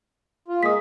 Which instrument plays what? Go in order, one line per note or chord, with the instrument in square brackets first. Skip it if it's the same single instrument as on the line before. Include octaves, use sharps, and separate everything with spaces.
[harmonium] F4
[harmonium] G#3 A#3 G#4 [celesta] D#6 B6